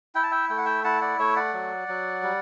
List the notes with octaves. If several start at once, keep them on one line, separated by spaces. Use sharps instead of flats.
E4 G5
A5
E5 G5
A3 G5
F#5
E5 G5
E4 F#5 A5
D5 F#5
A3 C#5 E5
D5 F#5
F#3
F#3
G3